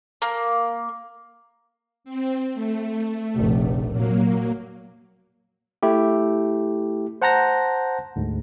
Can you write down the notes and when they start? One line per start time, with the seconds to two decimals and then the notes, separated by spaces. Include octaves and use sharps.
0.22 A#3
2.04 C4
2.54 A3
3.36 F1 A#1
3.92 A#2 F#3 A#3
5.83 A3 E4 G4
7.22 C5 F#5 A5 A#5 G6 A#6
8.16 D2 G#2